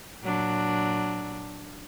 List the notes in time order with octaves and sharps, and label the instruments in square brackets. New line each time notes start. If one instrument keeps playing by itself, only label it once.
[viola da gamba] A#2 F#3 D4